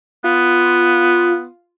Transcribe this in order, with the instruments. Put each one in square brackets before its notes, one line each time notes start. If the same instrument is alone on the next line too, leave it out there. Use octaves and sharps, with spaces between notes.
[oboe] B3 [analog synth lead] F4